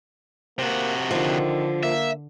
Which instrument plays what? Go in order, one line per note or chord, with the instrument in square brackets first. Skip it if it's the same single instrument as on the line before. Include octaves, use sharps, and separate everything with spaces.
[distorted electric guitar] C3 F#4 [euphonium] A#3
[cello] D3 [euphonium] D#3 [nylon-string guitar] F3
[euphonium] A#3 [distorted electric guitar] E5